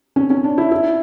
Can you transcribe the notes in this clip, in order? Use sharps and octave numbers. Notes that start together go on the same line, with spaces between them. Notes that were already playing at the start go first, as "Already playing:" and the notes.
C#4
C#4
D4
E4
E4